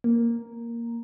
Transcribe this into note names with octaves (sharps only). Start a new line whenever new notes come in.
A#3